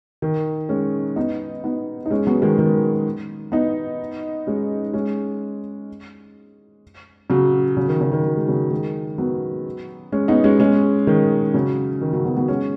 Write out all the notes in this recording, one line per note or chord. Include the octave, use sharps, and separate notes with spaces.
D#3
G#3 C#4
B3 D#4
B3 D#4
D#4
G#3 C#4
F#3 B3
D#3 G#3
D#3 G#3
B3 D#4
G#3 C#4
G#3 C#4
C#3 F#3
C#3 F#3
D#3
C#3
D#3
F#3
G#3
C#3 F#3
D#3 G#3
F#3 B3
G#3 C#4
B3 D#4
G#3 C#4
G#3 C#4
D#3 G#3
C#3 F#3
D#3
C#3 F#3
F#3 B3
F#3 B3
G#3 C#4